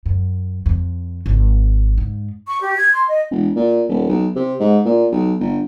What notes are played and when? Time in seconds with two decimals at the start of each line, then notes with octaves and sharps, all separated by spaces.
0.06 F#2
0.66 F2
1.26 G#1
1.98 G#2
2.47 C#6
2.62 G4
2.75 G#6
2.93 C6
3.08 D#5
3.31 E1
3.56 A#2
3.89 D#1
4.09 B1
4.35 C3
4.60 G#2
4.85 A#2
5.12 B1
5.40 G1